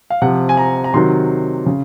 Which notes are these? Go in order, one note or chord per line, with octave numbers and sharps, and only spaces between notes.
F5
C3 F3 F#5
G#5
A#5
A#5
C3 D#3 F#3 C6
C#3